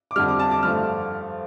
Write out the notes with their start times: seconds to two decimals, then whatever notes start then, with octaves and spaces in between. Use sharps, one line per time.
0.11 D6
0.16 F2 D3 G3 F6
0.28 D6
0.39 A5
0.51 D6
0.63 G2 F3 A3 F6